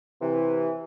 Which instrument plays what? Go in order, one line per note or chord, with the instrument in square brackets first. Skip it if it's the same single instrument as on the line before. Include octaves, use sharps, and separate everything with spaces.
[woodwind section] C3 E3